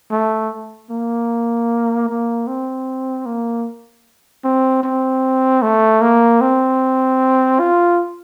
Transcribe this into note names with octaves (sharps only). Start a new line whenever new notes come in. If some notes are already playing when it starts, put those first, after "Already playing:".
A3
A#3
A#3
C4
A#3
C4
C4
A3
A#3
C4
F4